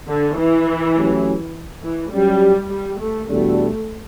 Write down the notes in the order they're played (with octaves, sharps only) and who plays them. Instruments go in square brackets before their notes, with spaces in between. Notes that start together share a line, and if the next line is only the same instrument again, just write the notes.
[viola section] D3
E3
[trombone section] F#3 A3 C#4 G4
[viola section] E3
[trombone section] F#3 C#4 G4 [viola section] G3
[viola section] G3
A3
[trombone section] E2 B2 G3 D4 F#4 [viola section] A3